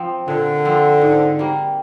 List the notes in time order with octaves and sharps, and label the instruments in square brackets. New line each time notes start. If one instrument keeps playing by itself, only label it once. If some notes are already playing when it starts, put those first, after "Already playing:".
Already playing: [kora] F3 C4
[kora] A#2 [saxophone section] D3
[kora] F3 C4
G#2
G3 A#3